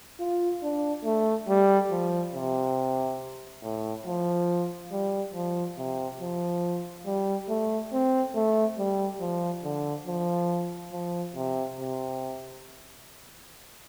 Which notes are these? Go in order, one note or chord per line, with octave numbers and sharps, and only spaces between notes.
F4
D4
A3
G3
F3
C3
A2
F3
G3
F3
C3
F3
G3
A3
C4
A3
G3
F3
D3
F3
F3
C3
C3